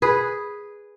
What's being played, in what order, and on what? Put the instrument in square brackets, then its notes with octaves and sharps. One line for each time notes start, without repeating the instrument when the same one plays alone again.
[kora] G#4 B4